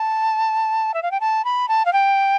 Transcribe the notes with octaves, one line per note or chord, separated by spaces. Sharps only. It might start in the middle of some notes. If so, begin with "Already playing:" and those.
Already playing: A5
E5
F5
G5
A5
B5
A5
F5
G5